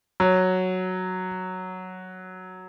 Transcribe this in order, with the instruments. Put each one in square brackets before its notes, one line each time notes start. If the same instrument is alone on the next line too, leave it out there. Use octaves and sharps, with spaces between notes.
[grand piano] F#3